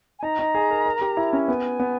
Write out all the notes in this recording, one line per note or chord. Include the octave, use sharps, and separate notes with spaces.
G#5
D#4 A#5
D#4
G#4
A#4
A#4
G4
E4
C#4
B3 G#5
B3